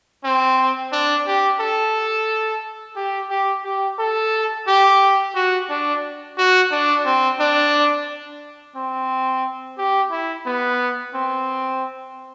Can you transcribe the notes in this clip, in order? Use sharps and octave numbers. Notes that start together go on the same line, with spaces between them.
C4
D4
G4
A4
G4
G4
G4
A4
G4
F#4
D4
F#4
D4
C4
D4
C4
G4
E4
B3
C4